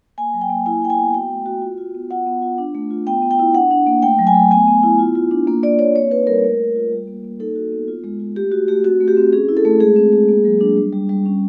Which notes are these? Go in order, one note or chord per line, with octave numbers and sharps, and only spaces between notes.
A#3 G#5
F#3
G5
A#3
E4 G#5
E4 G5
G#5
B3
F#4 G5
A3
F#4
F4
F4
B3
F4 F#5
B3
F4
D4
A3
F4
B3 G5
B3
G5
E4
D4 F#5
D4
A#3
A3 G5
F#3
G#5
A3
B3 G#5
B3
E4
F4
F4
D4
A#3
A#3 D5
A#3 C#5
C4 C#5
D#4 B4
G3 A#4
A3
A3
F4
G3
A#3
A#3
D#4 A4
F#4
B3
F4
G#3
F4
A3 G4
A3 F#4
A3 G4
C4 F#4
A3
G4
C4
C#4 G#4
E4
A4
A3
G#3 G#4
C4
G#3
A#3
F#3
D4
G3
G3
G3
C#4